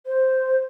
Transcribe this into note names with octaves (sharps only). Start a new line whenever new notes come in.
C5